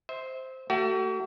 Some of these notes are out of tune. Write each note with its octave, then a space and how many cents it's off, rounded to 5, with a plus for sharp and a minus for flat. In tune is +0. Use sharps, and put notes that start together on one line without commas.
C5 +0 E5 -30
A3 +25 F#4 +35